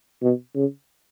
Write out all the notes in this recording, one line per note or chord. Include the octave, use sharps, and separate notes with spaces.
B2
C#3